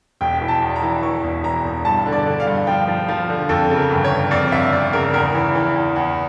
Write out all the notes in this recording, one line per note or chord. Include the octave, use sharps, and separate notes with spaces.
E1 G5
E3
A5
E2
A#5
E3
E3 C#6
E1
E3 A#5
E1
G2 A5
D3
D5
D3
F5
G2
F3 G5
F3
F3 F5
D3
F2 A4
C#3
A#4
G1
C#5
G1
F2 D5
G1 E5
G1 D5
C#3 A#4
E2 A#4
E3
E3
E2
E2